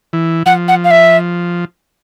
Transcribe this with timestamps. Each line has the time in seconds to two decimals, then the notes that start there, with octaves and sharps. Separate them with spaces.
0.13 E3
0.46 F3 F#5
0.68 F#5
0.84 F5
0.91 E5